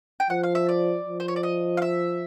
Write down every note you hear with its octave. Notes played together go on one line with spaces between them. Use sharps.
G5
F3 F#5
F5
E5
D5
F3
C5
C#5
D5
D#5
F5
E5